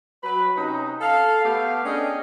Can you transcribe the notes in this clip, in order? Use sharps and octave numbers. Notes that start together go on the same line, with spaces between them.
F#3 B4
C3 C#4 D#4
A4 F5
A3 B3 G4 F5
C#4 D4 G#4 D#5 G5